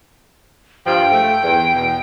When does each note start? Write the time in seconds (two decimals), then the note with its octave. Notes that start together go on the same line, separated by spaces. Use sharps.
0.86 G2 F3 G5
1.11 A3
1.44 E2
1.75 E2 B2